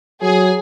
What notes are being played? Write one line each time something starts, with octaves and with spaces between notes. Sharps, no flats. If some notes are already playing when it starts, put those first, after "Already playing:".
F#3 G#4